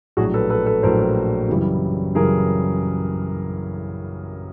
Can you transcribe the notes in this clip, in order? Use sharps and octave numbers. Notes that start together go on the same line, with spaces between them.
A#1 A2 F#3 F#4 G#4
A4 B4
A4 B4
A4 B4
A#1 A2 F#3 A#4 C5
F#2 C#3 E3 G3
F#2 C#3 E3 G3 G#4 A#4